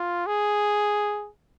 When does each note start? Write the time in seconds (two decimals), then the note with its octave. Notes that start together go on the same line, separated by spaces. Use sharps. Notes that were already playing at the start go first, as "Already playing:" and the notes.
Already playing: F4
0.27 G#4